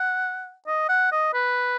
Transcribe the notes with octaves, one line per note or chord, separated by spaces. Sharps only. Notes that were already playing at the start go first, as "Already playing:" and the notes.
Already playing: F#5
D#5
F#5
D#5
B4